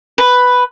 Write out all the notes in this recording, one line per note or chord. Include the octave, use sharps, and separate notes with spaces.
B4